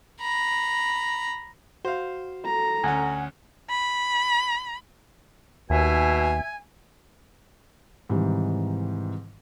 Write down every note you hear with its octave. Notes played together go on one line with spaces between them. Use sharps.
A#5 B5
F#4 C5 F5
A4 A#5
D2 C#4 F#5 G#5
B5
D#2 B2 E5 G#5
G#2 C3 D#3 E3 G3